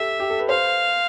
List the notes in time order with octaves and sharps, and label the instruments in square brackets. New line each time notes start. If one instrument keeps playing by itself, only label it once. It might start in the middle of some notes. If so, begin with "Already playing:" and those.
Already playing: [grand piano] G4 A4 [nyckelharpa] E5
[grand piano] G4
A4
B4
[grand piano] C5 [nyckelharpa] F5